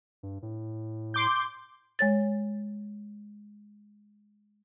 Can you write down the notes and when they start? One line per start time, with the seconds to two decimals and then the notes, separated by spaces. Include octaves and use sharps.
0.23 G2
0.42 A2
1.14 C6 D6 G6
1.99 G#3 C#5 A6